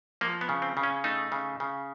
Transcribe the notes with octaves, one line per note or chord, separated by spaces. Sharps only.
F3 A#3
B3
C#3
C4
C#3
C#4
A3 D#4
C#3
C#3